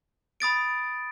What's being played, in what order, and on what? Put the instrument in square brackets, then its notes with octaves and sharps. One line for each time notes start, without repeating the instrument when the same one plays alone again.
[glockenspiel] B5 D#6 A6 D7